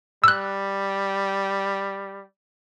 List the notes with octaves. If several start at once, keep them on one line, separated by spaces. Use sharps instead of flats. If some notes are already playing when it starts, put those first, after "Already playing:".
G3 E6 F#6